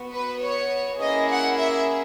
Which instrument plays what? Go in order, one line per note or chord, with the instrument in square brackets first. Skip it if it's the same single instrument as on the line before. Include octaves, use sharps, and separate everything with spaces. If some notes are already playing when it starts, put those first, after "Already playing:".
Already playing: [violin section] B3 F#4
B4
C#5
A#3 C#4 E4 G#4 D#5
F#5
E5